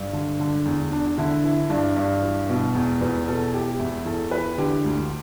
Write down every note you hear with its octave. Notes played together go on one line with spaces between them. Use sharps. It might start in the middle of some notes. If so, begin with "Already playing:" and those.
Already playing: G2
D3
D3
E2
E2 D4
D3 E4
E3 E4
G2 D4
G2
E3
B2
E2
E2 B3
B2 A4
E3 G4
G4
E2 E4
E2 A4
E3 B4
D3 G4
D2